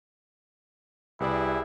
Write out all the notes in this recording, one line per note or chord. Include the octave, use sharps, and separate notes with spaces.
C2 E4 G4 G#4 B4 D5